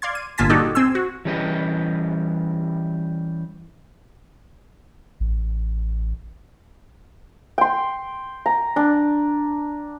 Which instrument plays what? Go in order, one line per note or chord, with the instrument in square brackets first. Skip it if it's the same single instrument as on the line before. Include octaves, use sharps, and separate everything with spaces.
[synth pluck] D5 F5 C6 G#6
D#7
G1 A#2 F4 G#5 A5 B6
D#4 F#4 G4 A4 D5 D#5
C4 G#5 C6 E6
F#4
[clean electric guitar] E3 G3 C#4 G4 B4 D#5
[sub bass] A1
[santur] G5 C6
A#5
D4